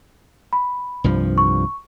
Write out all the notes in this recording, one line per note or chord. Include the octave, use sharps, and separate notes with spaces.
B5
C2 G2 F3
C#6